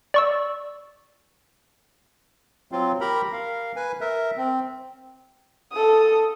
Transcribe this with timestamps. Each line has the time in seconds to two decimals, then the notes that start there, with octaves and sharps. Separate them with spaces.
0.14 D5 C#6 E6
2.72 F#3 C4 F4
3.01 G4 A#4 A#5 B5
3.33 A#4 F5
3.76 B4 G#5
4.01 A#4 E5
4.37 C4
5.72 A4 D#6